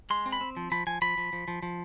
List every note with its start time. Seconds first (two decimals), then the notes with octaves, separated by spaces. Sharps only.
0.10 G#3 C6
0.26 C4
0.32 B5
0.41 C4
0.57 F3
0.72 F3 B5
0.87 F3 G#5
1.02 F3 B5
1.17 F3
1.33 F3
1.48 F3
1.62 F3